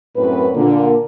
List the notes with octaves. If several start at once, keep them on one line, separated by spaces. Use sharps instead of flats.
F#2 A2 C4 B4
A#2 D3 A#3